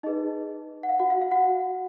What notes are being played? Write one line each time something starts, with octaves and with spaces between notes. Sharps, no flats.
D#4 G#4 B4 D#5
F#5
F5
F#4 F#5
F5
F5
F#4 F#5